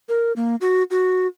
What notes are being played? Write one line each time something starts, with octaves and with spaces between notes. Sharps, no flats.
A#4
A#3
F#4
F#4